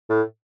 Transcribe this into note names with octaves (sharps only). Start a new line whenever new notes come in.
A2